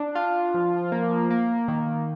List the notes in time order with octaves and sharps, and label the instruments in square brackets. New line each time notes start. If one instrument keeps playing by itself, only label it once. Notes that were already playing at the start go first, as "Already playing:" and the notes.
Already playing: [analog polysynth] D4
F4
F3
A#3
A#3
D#3